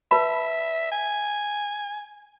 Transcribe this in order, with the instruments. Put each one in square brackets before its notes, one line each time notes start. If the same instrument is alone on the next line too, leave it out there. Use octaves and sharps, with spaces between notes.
[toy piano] B4 A5 B5 [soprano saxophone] E5
[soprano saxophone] G#5